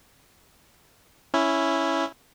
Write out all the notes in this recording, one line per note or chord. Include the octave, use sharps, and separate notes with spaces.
C#4 E4